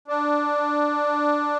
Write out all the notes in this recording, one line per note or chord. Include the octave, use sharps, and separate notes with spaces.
D4